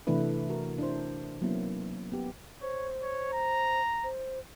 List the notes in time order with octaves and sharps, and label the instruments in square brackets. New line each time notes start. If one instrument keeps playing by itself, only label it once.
[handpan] C3 E3 A3 D4 E4 B4
F#4 A#4
D4 E4 C5
F#3 A#3 B3 C#4 E4
B3 G4
[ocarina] C5 [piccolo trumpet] C#5
[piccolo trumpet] C#5
A#5
[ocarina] C5